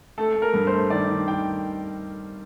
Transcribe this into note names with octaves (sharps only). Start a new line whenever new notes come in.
A3 A4
A3
A#4
G2
C5
A3
D#3 D5
D#3
D#3 G5